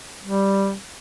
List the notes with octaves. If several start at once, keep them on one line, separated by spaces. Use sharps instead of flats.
G3